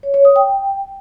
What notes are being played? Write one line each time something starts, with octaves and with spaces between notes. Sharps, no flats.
C#5
C#5
D#6
G5